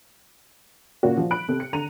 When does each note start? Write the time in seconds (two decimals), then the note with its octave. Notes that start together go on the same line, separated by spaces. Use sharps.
1.03 A#2 C#3 F#4
1.17 F3
1.31 B5 F#6 D7
1.48 C3 A4
1.60 C#7
1.73 D3 A#5 D#7 F7